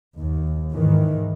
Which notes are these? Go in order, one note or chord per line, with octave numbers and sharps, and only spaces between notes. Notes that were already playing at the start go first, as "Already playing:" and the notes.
D#2
G#2 D#3 E3